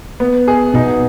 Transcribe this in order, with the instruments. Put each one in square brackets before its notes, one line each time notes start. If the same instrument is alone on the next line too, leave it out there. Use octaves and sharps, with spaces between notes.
[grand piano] B3
G#4
[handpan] B2 B3 [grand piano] D#4